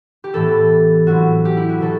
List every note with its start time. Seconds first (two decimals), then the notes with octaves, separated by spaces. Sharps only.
0.24 G4
0.33 A2 E3 B3 A4
1.07 A2 F#3 A3 C4 F#4
1.45 G4
1.57 E4
1.69 F#4
1.81 B2 F#3 A4